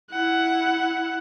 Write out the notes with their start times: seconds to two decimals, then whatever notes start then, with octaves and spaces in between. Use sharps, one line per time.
0.11 E4 F#5